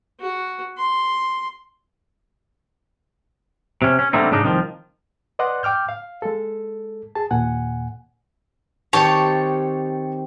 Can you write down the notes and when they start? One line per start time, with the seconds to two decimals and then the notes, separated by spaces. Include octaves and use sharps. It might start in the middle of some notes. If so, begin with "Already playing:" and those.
0.20 F#4
0.77 C6
3.82 C3 C#4
3.99 C#4
4.13 D3 G3 A3 A#3 C4 D#4
4.31 G#2 C#3 D4 D#4
4.44 C2 D#3 F3
5.39 B4 D5 D#5 F#5 C6 F#6
5.63 G5 D6 F6 G6
5.89 F5
6.22 G#3 A4
7.15 G#4 A5
7.31 D#2 A#2 F#5 G#5
8.93 D#3 C4 G4 C#5 A5